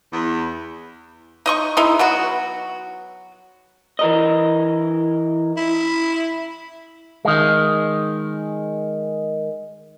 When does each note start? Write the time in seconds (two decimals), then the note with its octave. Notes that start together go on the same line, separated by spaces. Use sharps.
0.12 E2
1.46 D#4 D#5 C#6
1.77 G#3 D#4 E4
1.99 F#3 B3 F#4
3.99 E3 A#4 D#5
5.57 E4
7.25 D#3 G#3